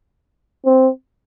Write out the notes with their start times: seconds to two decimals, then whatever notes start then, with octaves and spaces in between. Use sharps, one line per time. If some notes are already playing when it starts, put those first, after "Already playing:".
0.65 C4